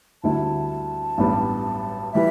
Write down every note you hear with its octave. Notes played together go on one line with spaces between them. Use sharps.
D2 D3 G3 E4 A5
A1 G2 G3 B3
E3 G3 E5